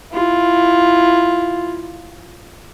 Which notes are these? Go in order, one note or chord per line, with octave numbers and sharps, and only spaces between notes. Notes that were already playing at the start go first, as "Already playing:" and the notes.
E4 F4